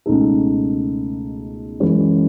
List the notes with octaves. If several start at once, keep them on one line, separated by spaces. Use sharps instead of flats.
C#2 B2 A3 D#4 A4
F#2 E3 G#3 C#4